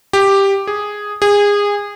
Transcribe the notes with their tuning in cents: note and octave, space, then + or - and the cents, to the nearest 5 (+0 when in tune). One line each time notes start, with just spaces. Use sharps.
G4 +5
G#4 -5
G#4 -25